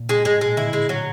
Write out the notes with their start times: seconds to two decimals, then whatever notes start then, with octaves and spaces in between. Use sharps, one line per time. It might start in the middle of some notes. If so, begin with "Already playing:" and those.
Already playing: A#2
0.09 G#3
0.25 A2 G#3
0.36 A2
0.41 A#2 G#3
0.57 D3 E4
0.73 G#3
0.89 F#3